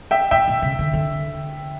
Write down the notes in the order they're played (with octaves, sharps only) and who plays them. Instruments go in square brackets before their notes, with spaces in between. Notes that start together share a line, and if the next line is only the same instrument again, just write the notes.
[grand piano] E5 G5
[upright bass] A2 [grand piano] E5 G5
[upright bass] A#2
C#3
D3
D3